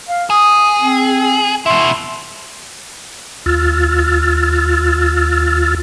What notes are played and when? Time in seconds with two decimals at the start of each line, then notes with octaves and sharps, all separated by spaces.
0.08 F5
0.30 G#4 D#6
0.80 C4
1.66 B2 E4 C6
3.46 D#2 F4 E6 F6 A6